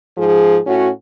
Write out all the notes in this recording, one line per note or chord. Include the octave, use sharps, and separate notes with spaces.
G#2 F3 G#4
A2 C#4 F#4